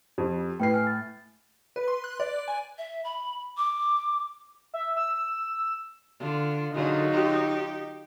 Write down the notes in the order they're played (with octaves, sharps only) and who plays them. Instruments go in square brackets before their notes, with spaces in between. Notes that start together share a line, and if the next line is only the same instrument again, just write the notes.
[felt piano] F2 [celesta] G4
[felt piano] A2 C7 [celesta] B4 G5
[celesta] G#5 F6
A6
[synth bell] B4
C6
F#6
D5
G#5
[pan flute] E5
B5
D6
[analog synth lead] E5
E6
[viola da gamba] D3 [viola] F4
[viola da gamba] D3 G#4 [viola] F#3 F4 [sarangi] D#4
[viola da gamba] G4